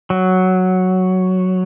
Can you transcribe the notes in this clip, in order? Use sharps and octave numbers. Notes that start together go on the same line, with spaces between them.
F#3